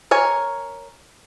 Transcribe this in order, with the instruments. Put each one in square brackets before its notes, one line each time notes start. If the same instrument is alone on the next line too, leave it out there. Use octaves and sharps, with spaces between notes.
[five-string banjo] A#4 C#5 G#5